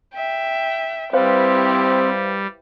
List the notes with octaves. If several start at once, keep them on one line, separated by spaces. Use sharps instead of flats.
E5 G5
G3 C4 E4 G4 B4 C5 F5